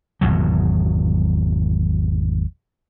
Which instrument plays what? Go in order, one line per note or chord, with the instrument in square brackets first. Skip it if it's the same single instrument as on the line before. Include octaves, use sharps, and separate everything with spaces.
[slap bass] G#1 E2 B2 F#3